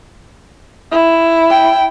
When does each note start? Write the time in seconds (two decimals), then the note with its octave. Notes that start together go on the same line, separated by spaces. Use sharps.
0.92 E4
1.51 G5